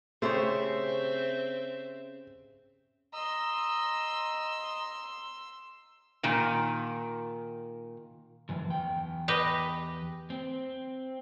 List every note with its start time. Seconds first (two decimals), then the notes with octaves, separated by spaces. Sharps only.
0.22 C#3 A3 C4 G4 G#4 C5 C#5 E5
3.13 D#5 A#5 C6 E6
6.23 A#2 D#3
8.49 F#2 E3 F3
8.68 E2 G5
9.28 G4 B4 D#5
10.30 C4